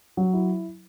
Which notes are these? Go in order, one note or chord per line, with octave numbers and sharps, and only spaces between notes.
F#3
E4